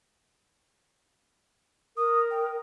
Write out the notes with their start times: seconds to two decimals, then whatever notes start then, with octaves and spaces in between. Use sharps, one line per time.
1.97 A#4 D#6
2.31 G5